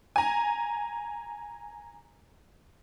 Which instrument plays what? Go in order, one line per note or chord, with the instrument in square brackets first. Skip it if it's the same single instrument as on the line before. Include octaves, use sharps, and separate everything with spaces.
[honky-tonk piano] G#5 A#5